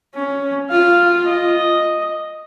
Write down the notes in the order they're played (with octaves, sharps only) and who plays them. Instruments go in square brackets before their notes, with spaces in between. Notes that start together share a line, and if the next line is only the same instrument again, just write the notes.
[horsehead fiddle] C#4
[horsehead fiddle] F4 [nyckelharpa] F5
[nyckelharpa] D#5